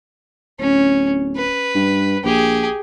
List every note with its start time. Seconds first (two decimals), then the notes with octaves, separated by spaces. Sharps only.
0.59 D1 C#4
1.36 B4
1.75 G2
2.24 A#1 G4 G#4